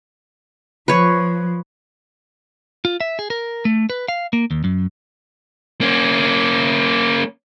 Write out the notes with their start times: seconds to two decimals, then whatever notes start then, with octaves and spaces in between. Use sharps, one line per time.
0.88 F3 B4 C#5
2.85 F4
3.01 E5
3.19 G#4
3.30 A#4
3.65 A3
3.90 B4
4.08 F5
4.33 A#3
4.51 D#2
4.64 F#2
5.81 A#3 C#4